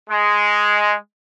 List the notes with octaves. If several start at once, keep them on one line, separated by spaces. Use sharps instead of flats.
G#3